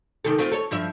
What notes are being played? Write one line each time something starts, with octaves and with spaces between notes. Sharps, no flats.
C3 D#3 A4
A3 C4 F4
A4 C#5
G2 F3 E5